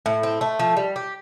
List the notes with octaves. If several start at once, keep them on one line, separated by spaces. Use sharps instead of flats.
A2
C4
A3
F3
G3
G4